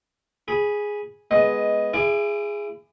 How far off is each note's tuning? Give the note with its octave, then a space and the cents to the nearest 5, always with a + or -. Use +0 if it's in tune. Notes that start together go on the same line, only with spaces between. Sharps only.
G#4 +0 B5 -10
G#3 +0 B3 +0 D#5 +10
E4 +30 G#4 -5 D6 +30